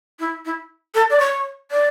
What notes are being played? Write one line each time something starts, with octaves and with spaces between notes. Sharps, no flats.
E4
E4
A4
D5
C#5
D5